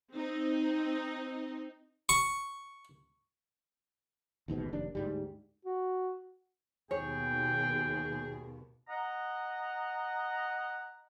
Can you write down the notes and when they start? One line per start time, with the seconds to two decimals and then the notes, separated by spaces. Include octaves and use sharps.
0.12 C4 D#4
2.09 C#6
4.48 A1 D#2 G#2 B2
4.73 F1 D#2 D4
4.95 D2 G#2 G3
5.65 F#4
6.91 D#2 B2 G#4 C#5 G5
8.89 D#5 F#5 A#5